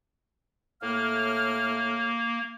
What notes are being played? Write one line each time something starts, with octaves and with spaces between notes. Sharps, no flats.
A2 A#3 F6